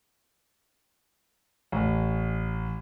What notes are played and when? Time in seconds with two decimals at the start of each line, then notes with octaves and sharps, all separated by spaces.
1.72 A1